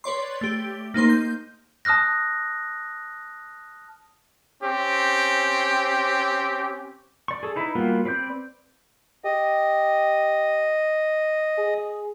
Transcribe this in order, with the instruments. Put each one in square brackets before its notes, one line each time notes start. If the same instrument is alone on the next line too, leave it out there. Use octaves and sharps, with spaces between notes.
[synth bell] B4 C#5 D5 C6
A3 G4
A#3 D#4 C5 C6
G6
[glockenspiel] A5 D#6 F6 F#6 A#6
[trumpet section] C4 C#4 G4
[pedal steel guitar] D5 C#6
G#4 A4
D#4 E4 B4
G3 A#3 B3 F4 F#4
C4 B4 D5 G6
[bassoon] G4 [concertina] D#5
[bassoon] G#4